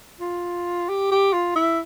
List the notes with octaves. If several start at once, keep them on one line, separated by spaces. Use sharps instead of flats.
F4
G4
G4
F4
E4